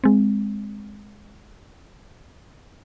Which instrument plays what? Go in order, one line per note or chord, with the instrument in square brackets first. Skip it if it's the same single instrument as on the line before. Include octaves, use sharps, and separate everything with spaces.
[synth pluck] G#3 C4